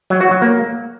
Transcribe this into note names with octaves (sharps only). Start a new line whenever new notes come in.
F#3
F#4
F#3
A#3